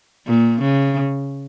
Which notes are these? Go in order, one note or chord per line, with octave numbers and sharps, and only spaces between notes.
A#2
C#3